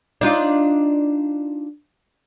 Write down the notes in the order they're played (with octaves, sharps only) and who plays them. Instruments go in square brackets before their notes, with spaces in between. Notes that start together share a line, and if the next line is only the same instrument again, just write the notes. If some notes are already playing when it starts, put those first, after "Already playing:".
[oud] D4 D#4 F4